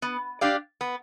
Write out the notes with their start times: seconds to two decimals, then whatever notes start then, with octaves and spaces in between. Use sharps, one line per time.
0.02 B3
0.41 D4 G4 D5 F5
0.81 B3